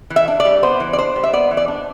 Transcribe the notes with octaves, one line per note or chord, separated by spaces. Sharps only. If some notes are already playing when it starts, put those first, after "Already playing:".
E3
E5
D4
D5
G3
B3 C5
E3
D5
D4 C5
G3
E5
B3 D5
E3
D5
D4